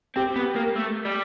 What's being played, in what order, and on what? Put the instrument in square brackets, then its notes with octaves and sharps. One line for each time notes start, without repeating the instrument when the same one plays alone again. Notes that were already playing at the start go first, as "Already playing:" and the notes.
[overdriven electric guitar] C4 [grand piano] G4
[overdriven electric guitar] B3
A#3
A3
G3